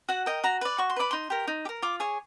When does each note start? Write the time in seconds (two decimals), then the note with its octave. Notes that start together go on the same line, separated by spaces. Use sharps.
0.09 F#4 F#5
0.26 A#4 D#5 G5
0.44 F#4 A#5
0.61 B4 D5
0.78 F#4 C#6
0.90 C6
0.96 B4 D5 B5
1.11 D#4 C6
1.30 G4 A#4
1.47 D#4
1.65 G4
1.69 A#4
1.82 F4 D6
2.00 G#4 C#5